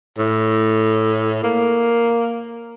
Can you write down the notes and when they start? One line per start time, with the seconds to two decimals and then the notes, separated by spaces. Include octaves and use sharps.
0.18 A2
1.44 A#3